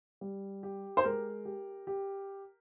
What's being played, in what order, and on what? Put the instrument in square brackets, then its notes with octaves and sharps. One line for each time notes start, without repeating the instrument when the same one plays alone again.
[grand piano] G3
G4
[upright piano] C5
[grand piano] G#3 [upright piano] A#4
[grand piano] G4
G4